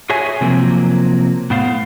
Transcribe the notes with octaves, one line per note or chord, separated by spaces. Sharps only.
F#4 G#4 C#5 E5 G#5
C3 F3 F#3 A#3 C4
A2 B3 C5 F5